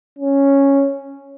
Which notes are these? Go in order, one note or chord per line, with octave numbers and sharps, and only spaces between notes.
C#4